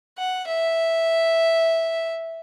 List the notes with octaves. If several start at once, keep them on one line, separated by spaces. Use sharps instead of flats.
F#5
E5